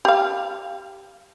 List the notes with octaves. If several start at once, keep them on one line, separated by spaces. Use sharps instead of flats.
G4 F5